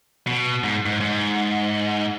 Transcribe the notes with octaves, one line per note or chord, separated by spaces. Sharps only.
B2
G#2
G#2
G#2